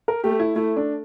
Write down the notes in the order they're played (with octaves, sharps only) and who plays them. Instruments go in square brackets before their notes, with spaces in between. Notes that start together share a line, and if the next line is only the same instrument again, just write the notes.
[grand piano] A#4
[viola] A3 [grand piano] G4
[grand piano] E4
[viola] A3 [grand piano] E4
[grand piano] D4